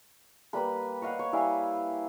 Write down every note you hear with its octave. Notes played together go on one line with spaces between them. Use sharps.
G3 A#3 B4 B5
C#5 D#5 F5 F#5
C#5
G3 E4 F5 G#5